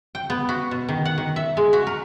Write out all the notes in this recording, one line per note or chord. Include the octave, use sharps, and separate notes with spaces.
G5
B3
F#4
B2
D#3
F#5
D#3
E5
G#3
F#4
A#4